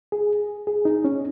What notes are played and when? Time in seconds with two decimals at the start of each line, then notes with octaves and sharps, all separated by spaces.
0.12 G#4
0.67 G#4
0.85 D#4
1.05 C#4